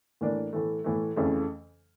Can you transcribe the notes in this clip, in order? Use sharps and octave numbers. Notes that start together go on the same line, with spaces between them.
A2 E3 A#3 D4
A2 E3 A3
A2 E3 A3
F2 C#3 E3 A3